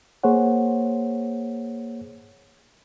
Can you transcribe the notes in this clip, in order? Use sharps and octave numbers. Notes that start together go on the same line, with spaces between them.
A#3 G#4 C5 C#5 F#5